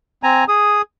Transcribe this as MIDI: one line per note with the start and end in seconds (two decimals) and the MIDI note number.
0.23 0.44 60
0.23 0.44 80
0.23 0.44 82
0.48 0.82 68
0.48 0.82 87